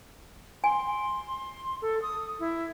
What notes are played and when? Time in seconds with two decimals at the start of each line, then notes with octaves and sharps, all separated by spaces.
0.64 G#5 C6
1.82 A4
2.02 D#6
2.40 E4